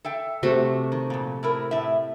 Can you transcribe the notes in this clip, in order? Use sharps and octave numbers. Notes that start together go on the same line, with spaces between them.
A4 E5 G5
C3 A3 F#4
D#3
F2 A#2
A2 E4 A#4
A2 E5